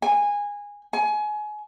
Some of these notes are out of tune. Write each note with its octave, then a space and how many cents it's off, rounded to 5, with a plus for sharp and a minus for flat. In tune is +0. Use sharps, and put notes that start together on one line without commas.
G#5 -20
G#5 +25